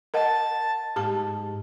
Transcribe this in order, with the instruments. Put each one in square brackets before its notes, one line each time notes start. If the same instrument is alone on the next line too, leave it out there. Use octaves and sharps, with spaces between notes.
[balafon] A#4 D#5 F#5 [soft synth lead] A5
[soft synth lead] G#2 [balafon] G4 A5